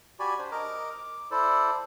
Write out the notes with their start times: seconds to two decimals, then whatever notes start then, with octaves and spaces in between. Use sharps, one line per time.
0.20 F#4 G4 D5 G#5 B5
0.39 D4 C5
0.52 A#4 D#5 A#5 D6
0.91 D6
1.31 E4 A4 C5 D5